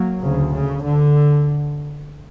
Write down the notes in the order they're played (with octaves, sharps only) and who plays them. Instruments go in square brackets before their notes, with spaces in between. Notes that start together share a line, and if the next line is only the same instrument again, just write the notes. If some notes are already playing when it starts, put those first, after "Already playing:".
Already playing: [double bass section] F#3 A#3
D2 C#3
C#3
D3